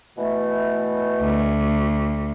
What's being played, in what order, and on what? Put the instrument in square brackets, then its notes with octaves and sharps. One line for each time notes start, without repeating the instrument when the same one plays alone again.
[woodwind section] B2 E3 A3
[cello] D2